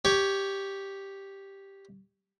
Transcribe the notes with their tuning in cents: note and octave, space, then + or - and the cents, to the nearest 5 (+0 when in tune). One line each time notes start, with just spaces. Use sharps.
G4 +0 C#5 +10